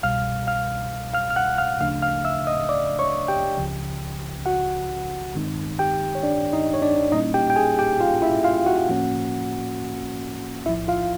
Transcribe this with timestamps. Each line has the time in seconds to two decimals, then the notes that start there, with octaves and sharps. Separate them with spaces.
0.03 C2 B2 G3 F5 F6
0.47 F5 F6
1.13 F5 F6
1.30 F6
1.36 F#5 F#6
1.58 F5 F6
1.80 D2 C#3 F3 A3 D4 F5 F6
2.02 F5 F6
2.24 E5 E6
2.47 D#5 D#6
2.69 D5 D6
2.99 C#5 C#6
3.28 G4 G5
3.57 C#2 C#3 F3
4.46 F#4 F#5
5.35 G2 D#3 G#3 C4 D#4
5.79 G4 G5
6.15 C#5
6.23 D4 D5
6.53 D#4 D#5
6.74 C#5
6.82 D4 D5
7.12 A#2 G3 A#3 C#4 D#4 E4 D#5
7.34 G4 G5
7.50 G5
7.56 G#4 G#5
7.79 G4 G5
8.00 F4 F5
8.22 E4 E5
8.44 F4 F5
8.66 F#4 F#5
8.89 A2 F3 A#3 C#4
10.66 B1 A2 F3 E4 E5
10.88 F4 F5